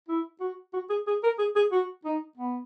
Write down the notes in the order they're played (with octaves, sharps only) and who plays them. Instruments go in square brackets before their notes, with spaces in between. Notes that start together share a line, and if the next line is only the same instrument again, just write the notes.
[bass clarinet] E4
F#4
F#4
G#4
G#4
A#4
G#4
G#4
F#4
D#4
B3